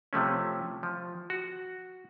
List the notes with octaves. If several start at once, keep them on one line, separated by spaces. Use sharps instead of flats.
C3 F3 A3 C#4
F3
F#4